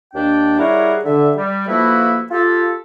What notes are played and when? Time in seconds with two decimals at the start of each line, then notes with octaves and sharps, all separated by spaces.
0.14 D#2 D4 G5
0.59 G3 E4 G#4 A#4 C#5 F#5
1.04 D3 E5
1.36 G3
1.67 F3 A3 A#3 E4 F#4 B4
2.31 F4 G4 A4